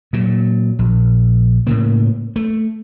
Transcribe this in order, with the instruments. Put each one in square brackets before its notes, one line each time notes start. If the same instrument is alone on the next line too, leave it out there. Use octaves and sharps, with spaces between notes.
[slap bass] A#2 F#3
A#1
A2 C#3 A#3
A3